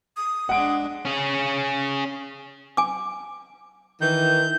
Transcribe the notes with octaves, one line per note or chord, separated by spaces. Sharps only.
D#6
G#3 D4 F#5 D7
C#4 G#4
G#5 D6
D#3 E3 G6